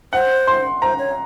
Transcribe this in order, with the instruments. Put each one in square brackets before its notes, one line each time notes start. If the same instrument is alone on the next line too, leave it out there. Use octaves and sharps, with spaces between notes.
[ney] C5 [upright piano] F#5
[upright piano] C6
[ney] C5 [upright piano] A#5
[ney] C#5